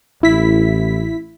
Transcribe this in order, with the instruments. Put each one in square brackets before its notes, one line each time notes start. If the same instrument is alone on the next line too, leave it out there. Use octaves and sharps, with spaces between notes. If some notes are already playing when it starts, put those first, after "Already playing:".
[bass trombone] A1 [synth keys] E4 B6